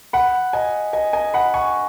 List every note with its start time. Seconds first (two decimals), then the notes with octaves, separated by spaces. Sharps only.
0.13 F#5 B5
0.53 D#5 G#5
0.93 D#5 G#5
1.13 D#5 G#5
1.34 F#5 B5
1.54 G#5 C#6